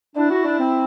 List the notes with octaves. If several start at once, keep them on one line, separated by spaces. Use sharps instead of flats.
D4 E4
F#4
D4
C4